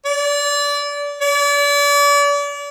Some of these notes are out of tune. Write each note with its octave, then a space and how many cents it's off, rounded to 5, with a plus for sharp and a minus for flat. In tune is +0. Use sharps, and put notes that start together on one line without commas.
D5 -30
D5 -40